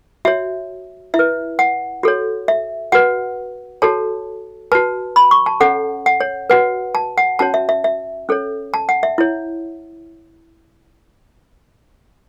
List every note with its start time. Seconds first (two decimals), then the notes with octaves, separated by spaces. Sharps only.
0.25 F#4 C#5 E5
1.14 E4 E5
1.19 B4
1.59 F#5
2.03 F#4 A4 C#5
2.48 E5
2.92 F#4 B4 F#5
3.82 F#4 A4 C#5 A5
4.72 F#4 B4 A5
5.16 B5
5.31 C#6
5.46 A5
5.60 C#4 A4 C#5 F#5
6.06 F#5
6.20 C#5
6.50 F#4 B4 F#5
6.95 A5
7.18 F#5
7.39 C#4 F#4 C#5 A5
7.54 E5
7.69 E5
7.84 E5
8.29 C#4 A4 C#5
8.74 A5
8.89 F#5
9.03 E5
9.18 E4 C#5